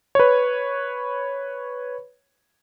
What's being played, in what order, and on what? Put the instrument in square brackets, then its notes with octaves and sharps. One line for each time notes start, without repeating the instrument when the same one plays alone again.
[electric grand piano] B4 C#5